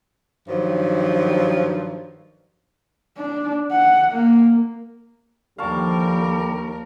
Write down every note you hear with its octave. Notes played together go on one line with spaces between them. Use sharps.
G2 D#3 F3 F#3
D4
F#5
A#3
D#2 D3 F3 G3 A#4 F5 A5 C#6